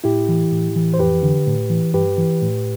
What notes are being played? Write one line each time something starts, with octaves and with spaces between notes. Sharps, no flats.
A2 E4 G4
E3
A2
E3
C5
F2 G4 B4
D3
A2
E3
G2 G4 B4
E3
A2